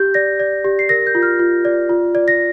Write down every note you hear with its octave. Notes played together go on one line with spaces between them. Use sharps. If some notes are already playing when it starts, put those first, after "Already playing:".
Already playing: G4 G6
D5 A#6
D5
G4
C7
A#4 A#6
G6
F4
F6
F4
D5
F4
D5
A#6